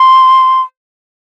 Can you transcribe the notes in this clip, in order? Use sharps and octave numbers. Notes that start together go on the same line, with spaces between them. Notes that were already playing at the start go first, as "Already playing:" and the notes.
Already playing: C6